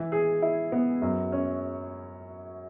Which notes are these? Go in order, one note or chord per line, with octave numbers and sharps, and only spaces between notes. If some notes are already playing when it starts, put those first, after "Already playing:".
Already playing: E3
G#4
E4
B3
F#2
C#4